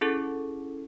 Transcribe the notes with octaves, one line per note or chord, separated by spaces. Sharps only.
C#4 E4 G#4 A4